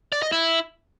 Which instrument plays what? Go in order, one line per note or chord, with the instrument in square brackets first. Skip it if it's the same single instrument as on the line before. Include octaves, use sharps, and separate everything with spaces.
[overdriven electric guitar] D5
D#5
E4